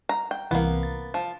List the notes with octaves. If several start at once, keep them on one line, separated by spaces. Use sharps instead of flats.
A#5
G5
C2 C3 E3 A#3 B3
A6
F3